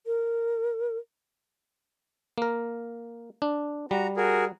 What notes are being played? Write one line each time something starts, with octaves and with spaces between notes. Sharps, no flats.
A#4
A#3 A#4
D4
G3 F#4 A#5
F#4 G#4 A#4